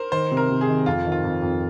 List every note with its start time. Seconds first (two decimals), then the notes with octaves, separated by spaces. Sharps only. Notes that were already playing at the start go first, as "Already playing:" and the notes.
Already playing: A#4 C5
0.12 D#3 C5
0.31 C3
0.37 A#4
0.50 C3
0.61 G#4
0.68 D#3
0.86 F2 F4
1.05 D#3
1.12 F4
1.24 F2
1.42 F2